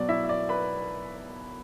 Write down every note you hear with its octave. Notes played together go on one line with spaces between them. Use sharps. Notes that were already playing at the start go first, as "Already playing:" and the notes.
Already playing: B2 F#3 D5
E4 E5
E5
D5
B4 B5